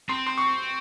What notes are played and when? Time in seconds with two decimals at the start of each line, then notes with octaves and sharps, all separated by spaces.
0.09 C4 C6
0.27 C6
0.38 C#6